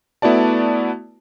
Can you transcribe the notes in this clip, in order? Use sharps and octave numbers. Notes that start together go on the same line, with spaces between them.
A3 B3 E4 F#4 D5 A5